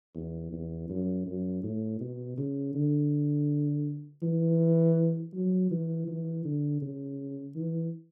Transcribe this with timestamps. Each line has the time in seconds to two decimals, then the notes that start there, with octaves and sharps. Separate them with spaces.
0.15 E2
0.53 E2
0.89 F#2
1.26 F#2
1.63 A2
2.00 B2
2.37 C#3
2.75 D3
4.23 E3
5.34 F#3
5.71 E3
6.07 E3
6.45 D3
6.82 C#3
7.56 E3